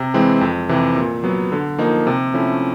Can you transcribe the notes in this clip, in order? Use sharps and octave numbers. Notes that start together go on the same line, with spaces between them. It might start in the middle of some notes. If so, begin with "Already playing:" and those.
Already playing: C3
E3 G#3 C4
F2
C3 E3
A#2
F#3 B3
D3
F3 A#3 D#4
C3
F3 A3 C#4 E4